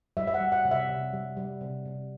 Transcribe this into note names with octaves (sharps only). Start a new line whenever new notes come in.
G3 E5
E5
F#5
G3
F#5
C3
E5
C3
G3
G3
C3
C3